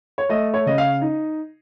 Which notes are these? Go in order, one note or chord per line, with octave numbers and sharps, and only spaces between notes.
C#5
A3 D#5
C#5
C#3 D#5
F5
D#4